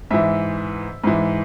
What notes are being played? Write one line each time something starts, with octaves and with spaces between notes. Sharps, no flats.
G#2 E3 E5
G#2 E3